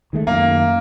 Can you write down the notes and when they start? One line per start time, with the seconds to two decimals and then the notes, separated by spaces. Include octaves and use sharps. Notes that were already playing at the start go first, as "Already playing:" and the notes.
0.13 D#3 G#3 A3
0.27 F#2 D#3 A#3